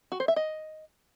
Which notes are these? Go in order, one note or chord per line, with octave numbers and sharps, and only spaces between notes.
F#4
C5
E5
D#5